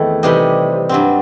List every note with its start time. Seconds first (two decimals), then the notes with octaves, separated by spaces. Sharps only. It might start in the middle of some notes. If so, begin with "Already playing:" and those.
Already playing: E2 D#3 A3 C4 E4
0.23 C3 E3 G3 D#4
0.89 G2 F#3 C4